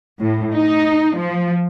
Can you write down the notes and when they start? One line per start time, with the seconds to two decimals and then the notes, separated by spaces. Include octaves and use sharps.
0.20 A2
0.54 D#4
1.16 F3